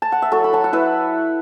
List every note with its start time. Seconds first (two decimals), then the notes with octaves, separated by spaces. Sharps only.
0.02 A5
0.12 F#5
0.22 E5
0.32 F#3 A4 C#5
0.44 B5
0.53 F#3 A5
0.64 F#5
0.73 E4 B4 E5